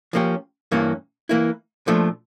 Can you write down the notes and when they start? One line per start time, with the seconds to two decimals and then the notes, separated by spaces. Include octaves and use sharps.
0.13 F3 A#3 C#4 G4
0.72 G2 E3 A#3 C#4
1.29 E3 A#3 E4
1.87 A#2 F3 A3 D4